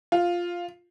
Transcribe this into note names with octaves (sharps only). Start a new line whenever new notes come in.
F4